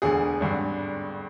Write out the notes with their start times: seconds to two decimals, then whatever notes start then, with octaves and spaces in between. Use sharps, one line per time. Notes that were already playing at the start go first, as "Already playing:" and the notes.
0.02 E1 D2 D3 G#4
0.40 G#1 G2 D3